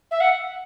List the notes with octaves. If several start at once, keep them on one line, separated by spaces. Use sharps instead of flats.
E5
F#5